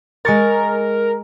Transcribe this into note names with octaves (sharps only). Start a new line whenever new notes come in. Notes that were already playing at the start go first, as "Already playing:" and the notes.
G#3 A#4 C#6 A6